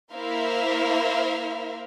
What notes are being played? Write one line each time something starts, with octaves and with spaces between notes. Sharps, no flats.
A#3 E4 A#4 C5 E5 F5